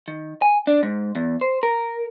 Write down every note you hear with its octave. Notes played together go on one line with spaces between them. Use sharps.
D#3
G#5
D4
G#2
E2
C5
A#4